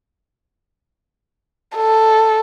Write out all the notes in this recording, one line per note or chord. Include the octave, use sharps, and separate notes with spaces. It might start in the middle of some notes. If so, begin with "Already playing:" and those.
A4